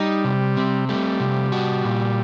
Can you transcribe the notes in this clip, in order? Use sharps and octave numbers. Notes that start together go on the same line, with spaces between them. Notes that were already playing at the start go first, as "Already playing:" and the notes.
Already playing: G3 D#4
C3
C4
G3 A3
C3
F#4
A#2